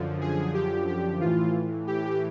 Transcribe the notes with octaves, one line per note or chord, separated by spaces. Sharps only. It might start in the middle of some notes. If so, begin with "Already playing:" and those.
Already playing: F#2 D3 F3
G#4
G4
G4
A2 E3 F4
G4